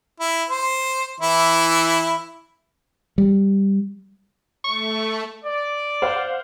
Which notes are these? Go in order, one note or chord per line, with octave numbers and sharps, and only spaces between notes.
E4
C5
E3 E4
G3
A3 C#6
D5
C5 F5 F#5